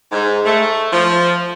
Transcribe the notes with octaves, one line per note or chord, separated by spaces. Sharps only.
G#2
A3
F3